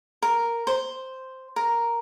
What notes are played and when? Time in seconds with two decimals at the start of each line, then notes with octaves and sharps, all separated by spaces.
0.22 A#4
0.67 C5
1.56 A#4